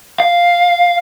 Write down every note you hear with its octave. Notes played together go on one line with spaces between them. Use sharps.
F5